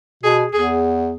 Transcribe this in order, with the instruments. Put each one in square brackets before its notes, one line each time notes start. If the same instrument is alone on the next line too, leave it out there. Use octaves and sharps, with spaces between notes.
[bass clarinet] B2 [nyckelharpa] G#4
[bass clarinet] E2 [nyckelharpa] G#4